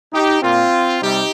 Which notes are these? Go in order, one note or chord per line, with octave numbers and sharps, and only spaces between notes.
D#4 G4
A#2 A#3 C4 F4
C3 G3 D#4 G4